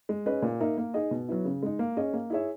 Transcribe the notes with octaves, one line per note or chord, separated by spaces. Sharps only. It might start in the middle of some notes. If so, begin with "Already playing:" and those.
G#3
C#4 G#4 B4 D#5
A#2
A#3 D#4 A#4 E5
A#3
D#4 G#4 D#5
B2
F#3 B3 E4
C#3
G#3 D#4
A#3
C#4 G#4 D#5
A#3
E4 G#4 C#5 E5